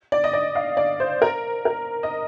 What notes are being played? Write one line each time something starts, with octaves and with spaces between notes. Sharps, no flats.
D5
D#5
D5
F5
D5
C5
A#4
A#4
D#5